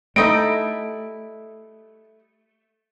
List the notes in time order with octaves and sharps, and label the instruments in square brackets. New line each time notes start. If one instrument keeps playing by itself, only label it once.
[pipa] G3 D#4 E4 [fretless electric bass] A3 [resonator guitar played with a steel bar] A4 D#5 [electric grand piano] D7